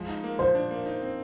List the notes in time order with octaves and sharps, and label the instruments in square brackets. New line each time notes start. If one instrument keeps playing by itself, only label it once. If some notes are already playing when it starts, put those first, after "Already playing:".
Already playing: [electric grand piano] F3 G#3
D#4
A#3
[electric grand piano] F3 [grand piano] C5
[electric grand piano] D4
A#3
D#4
C4